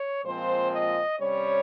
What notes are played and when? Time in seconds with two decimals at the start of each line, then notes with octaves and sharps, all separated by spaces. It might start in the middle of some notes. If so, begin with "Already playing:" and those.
Already playing: C#5
0.24 A#2 F3 G#3 C4 C5
0.72 D#5
1.19 C3 G3 C#4 C#5